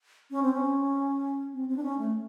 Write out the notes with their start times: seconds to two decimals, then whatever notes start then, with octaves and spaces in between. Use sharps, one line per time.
0.31 C#4
0.43 C4
0.53 C#4
1.53 C4
1.68 C4
1.76 D4
1.83 C#4
1.98 A3